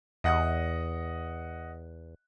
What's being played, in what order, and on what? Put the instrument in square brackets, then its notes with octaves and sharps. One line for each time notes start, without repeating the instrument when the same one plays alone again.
[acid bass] E2 [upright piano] D#5 F#5 D#6